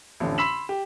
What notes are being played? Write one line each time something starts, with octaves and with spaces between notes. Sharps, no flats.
A1 F2 D3
B5 C6 E6 B6 E7 F#7
G4